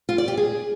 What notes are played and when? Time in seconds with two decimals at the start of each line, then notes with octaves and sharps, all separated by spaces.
0.09 F4
0.18 D5
0.28 G4
0.37 G#4